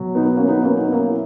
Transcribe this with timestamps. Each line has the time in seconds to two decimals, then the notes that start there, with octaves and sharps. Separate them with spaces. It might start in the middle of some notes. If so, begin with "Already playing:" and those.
Already playing: B2 F#3
0.15 B3 D#4
0.26 B3
0.37 A#3 C#4
0.48 B3 D#4
0.63 A#3 C#4
0.78 B3 D#4
0.88 B3
0.92 A#3 C#4
1.09 E4